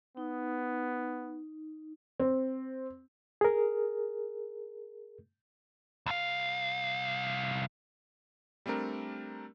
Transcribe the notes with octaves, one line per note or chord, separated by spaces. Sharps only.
B3 D#4
C4
G#4 A#4
C2 F5
G3 A3 C4 D4 A#4